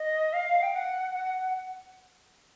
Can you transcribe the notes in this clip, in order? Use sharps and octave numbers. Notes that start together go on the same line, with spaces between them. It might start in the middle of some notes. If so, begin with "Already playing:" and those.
Already playing: D#5
F5
G5
F#5
F#5